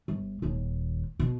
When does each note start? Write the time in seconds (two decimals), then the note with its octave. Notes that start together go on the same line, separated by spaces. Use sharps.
0.08 G1
0.42 D#1 D#2
1.19 B2